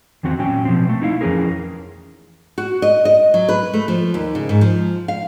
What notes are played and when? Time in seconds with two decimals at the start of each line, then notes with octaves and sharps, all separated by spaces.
0.23 E2 D#3 C4 F#4
0.39 A#2 F#3 C#4 G5
0.65 B2 F3 C4
0.89 A3
1.02 D#4 E4 F5
1.21 F2 E3 B3 C#4 G#4 A#4
2.58 F#4
2.82 D#5
3.05 D#5
3.34 F#3
3.49 B4
3.74 A3
3.88 F3
4.14 D#2
4.35 C#3
4.49 G#2
4.61 F3
5.08 F5